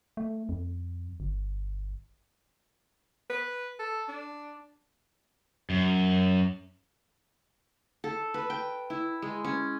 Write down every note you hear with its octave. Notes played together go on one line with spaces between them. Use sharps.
A3
F2
G1
B4
A4
D4
F#2
A4
B4
G5
E4
G#3
C#4